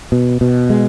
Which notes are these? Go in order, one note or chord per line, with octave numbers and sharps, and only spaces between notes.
B2
B2
G#3